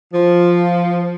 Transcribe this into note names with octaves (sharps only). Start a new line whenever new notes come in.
F3